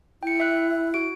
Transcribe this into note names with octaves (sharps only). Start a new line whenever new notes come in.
E4 G5 C#7
E5 F#6
F#4 D7